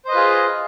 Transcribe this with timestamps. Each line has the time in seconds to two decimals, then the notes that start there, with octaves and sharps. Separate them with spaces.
0.05 C5
0.08 D#5
0.11 B4
0.14 F4
0.17 G#4